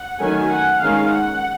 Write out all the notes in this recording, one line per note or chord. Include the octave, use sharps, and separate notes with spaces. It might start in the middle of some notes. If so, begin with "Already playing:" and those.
Already playing: F#5
D#3 F#3 A3 C#4 G#5
F#5
D#3 G#3 C#4 F5
F#5